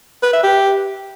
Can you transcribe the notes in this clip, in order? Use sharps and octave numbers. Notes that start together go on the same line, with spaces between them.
B4
E5
G4